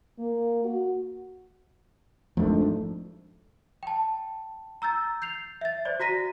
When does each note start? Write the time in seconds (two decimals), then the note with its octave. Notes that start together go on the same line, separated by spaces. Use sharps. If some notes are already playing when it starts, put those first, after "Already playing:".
0.18 A#3
0.64 F#4
2.37 G#1 G#2 F3 A3 D4
3.83 G5 A5
4.82 A#5 E6 G6 A6
5.22 G6 C7 F7
5.61 E5 A6
5.85 C5 D5
6.00 F#4 A#5 A#6 B6 D#7